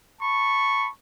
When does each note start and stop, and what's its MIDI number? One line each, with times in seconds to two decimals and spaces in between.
0.20 0.89 81
0.20 0.89 83
0.20 0.89 85